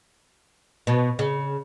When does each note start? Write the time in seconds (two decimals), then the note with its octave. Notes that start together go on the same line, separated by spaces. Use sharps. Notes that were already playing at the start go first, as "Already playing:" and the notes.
0.87 B2
1.19 C#3